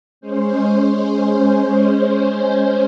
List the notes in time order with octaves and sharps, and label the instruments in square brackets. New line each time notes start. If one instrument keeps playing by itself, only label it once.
[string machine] G#3 C#4 C5